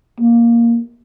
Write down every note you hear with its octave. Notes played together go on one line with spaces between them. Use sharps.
A#3